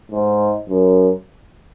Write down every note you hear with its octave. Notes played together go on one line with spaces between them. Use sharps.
G#2
F#2